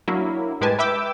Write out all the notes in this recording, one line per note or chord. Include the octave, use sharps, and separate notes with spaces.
F#3 A#3 D4 E4
A2 G#3 G4 B4 G#5 A5
B4 E5 G5 D6 E6 G6